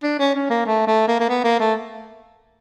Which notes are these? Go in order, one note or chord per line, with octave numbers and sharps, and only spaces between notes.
D4
C#4
C#4
A#3
A3
A3
A#3
A#3
B3
A#3
A3